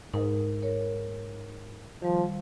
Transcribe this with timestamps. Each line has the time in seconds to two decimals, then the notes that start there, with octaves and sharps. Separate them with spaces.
0.14 G#2 D#4 A#4
0.62 A#4 C#5
2.03 D#3 F3 G3